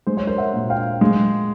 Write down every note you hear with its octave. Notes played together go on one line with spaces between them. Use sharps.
G#3 C5
C#5
A#4 C5
E5 F#5
A#2
F5 G5
G#3